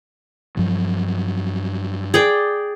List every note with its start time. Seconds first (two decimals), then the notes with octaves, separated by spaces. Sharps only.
0.57 G2 F3 F#3
2.14 G#4 D5 G5